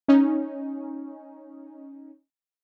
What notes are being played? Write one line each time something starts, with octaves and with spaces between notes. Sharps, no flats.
C#4 D#4